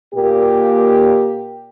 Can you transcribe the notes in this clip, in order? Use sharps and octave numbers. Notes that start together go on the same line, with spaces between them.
A#2 A#3 G4